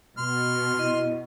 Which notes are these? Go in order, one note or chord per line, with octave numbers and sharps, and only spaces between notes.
B2 C6 F6
E4 D#5